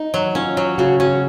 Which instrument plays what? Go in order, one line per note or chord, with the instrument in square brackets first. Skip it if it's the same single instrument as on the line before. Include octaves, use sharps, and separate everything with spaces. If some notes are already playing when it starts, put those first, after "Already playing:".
Already playing: [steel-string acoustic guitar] D#4
[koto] F#3
[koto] C#4 [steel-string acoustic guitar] F4
[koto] F#3
[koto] C#3 [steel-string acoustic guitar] F#4
[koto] C#4 [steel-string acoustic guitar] F#4